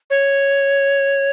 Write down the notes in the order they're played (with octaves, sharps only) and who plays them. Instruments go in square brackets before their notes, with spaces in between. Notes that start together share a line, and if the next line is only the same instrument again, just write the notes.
[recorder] C#5